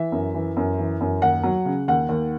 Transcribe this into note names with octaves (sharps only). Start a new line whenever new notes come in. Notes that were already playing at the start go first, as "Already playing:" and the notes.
Already playing: E3 E5
F#2
E3
F#2
E3
F#2
D#2 F#5
F#3
C#3
D#2 F#5
D#2